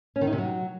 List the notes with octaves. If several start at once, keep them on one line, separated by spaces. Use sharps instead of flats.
C#4
D#3
D#4
C3
F#3